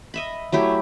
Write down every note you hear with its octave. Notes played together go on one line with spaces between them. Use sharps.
D#5 E5 B5
F#3 A3 E4 G4